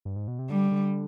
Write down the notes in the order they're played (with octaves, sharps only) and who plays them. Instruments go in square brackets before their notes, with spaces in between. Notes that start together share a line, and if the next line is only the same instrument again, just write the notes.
[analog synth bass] G2
G#2
B2
C3
[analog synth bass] D3 [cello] G3
[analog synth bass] D3